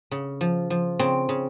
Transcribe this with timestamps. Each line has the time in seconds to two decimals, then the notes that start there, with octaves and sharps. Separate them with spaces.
0.11 C#3
0.41 F3
0.70 F3
0.99 C#3 C4
1.29 C#3